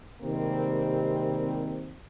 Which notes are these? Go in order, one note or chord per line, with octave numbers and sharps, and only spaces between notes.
C3 D#3 G3 G#3 A#3 C4